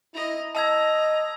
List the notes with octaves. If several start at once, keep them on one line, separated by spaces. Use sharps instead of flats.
E4 D#5 A#5
D#5 A5 A#5 E6 G#6